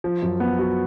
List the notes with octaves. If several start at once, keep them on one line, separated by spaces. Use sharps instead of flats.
F3
F#2
B3
F#4